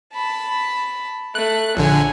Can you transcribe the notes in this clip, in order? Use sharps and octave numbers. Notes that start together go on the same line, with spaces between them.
A5 B5
A3 F#6
A#1 D3 C#5 G#5